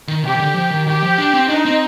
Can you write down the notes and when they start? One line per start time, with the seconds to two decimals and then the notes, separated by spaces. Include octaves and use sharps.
0.08 D#3
0.24 C3 G4
0.35 D#3
0.40 D3
0.55 F3
0.71 D#3
0.86 D#3 G4
1.03 F3
1.18 D4
1.34 C4
1.49 D4 D#4
1.65 C4